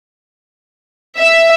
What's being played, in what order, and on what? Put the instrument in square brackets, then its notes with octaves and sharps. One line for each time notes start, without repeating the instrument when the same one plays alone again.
[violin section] E5